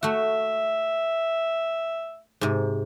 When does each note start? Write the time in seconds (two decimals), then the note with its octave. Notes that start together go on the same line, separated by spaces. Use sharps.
0.03 A3 F#4 E5
2.41 G#2 C3